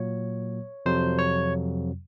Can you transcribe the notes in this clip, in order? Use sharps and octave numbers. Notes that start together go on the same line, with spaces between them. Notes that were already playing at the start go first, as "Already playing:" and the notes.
Already playing: A#2 F#3 A#3 C#5
F2 C3 F#3 C5
C#5